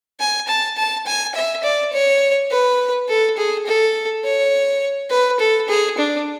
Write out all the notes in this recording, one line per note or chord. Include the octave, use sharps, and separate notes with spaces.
G#5
A5
A5
G#5
E5
D5
C#5
B4
A4
G#4
A4
C#5
B4
A4
G#4
D4